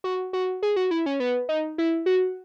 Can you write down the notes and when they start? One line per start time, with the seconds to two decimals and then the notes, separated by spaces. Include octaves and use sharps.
0.04 F#4
0.33 F#4
0.63 G#4
0.76 F#4
0.91 E4
1.06 C#4
1.20 B3
1.49 D#4
1.78 E4
2.06 F#4